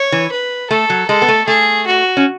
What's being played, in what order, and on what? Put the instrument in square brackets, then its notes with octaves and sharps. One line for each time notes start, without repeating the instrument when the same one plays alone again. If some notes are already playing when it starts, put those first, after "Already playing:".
Already playing: [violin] C#5
[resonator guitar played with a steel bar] E3
[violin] B4
[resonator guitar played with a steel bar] A3 [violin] A4
[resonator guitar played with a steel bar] F#3
[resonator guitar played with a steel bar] G#3 [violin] A4
[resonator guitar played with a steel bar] B3
A3
[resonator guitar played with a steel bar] A3 [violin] G#4
[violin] F#4
[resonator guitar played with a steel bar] C#4